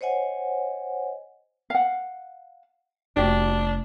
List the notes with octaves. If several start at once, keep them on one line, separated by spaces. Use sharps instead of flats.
C5 C#5 D#5 F#5 G#5
F5 F#5
F1 D4 F#4 G4